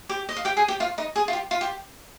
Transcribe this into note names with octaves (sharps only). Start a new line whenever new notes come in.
G4 G5
D#5
F5
G4 G5
G#4 G#5
G4 G5
F4 F5
D#4 D#5
G#4
F4
G4
F4
G4